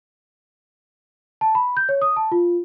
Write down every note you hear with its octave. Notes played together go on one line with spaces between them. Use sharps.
A5
B5
G6
C#5
D#6
A5
F4